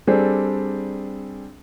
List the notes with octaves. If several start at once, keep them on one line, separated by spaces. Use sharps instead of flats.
G3 C4 D4 G#4 A4